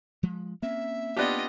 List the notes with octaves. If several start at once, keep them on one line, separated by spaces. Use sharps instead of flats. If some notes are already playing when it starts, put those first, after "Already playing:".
F3 G#3
A#3 C4 C#4 E5
B3 D4 F4 G4 D#5